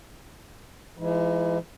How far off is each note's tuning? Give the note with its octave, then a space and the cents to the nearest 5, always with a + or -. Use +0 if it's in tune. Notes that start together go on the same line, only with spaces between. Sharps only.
E3 +45 G#3 +5 E4 -40